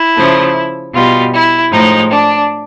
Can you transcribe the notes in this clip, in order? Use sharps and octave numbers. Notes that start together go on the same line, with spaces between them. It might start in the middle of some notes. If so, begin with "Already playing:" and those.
Already playing: E4
C#3 F3 A3
B2 G3 F4
E4
A2 F3 G#3 D#4
D4